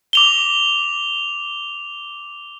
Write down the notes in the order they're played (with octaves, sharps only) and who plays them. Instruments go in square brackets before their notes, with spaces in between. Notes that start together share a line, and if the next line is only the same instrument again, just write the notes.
[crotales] D6 F7 G7